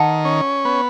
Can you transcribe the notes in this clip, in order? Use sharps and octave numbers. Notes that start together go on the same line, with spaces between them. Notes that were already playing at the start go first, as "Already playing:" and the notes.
Already playing: D#3 F#5 A5
C#4
B3